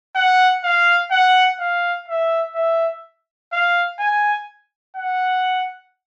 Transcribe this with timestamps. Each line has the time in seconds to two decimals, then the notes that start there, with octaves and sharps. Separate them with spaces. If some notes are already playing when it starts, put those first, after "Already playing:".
0.16 F#5
0.64 F5
1.11 F#5
1.60 F5
2.08 E5
2.55 E5
3.53 F5
4.00 G#5
4.97 F#5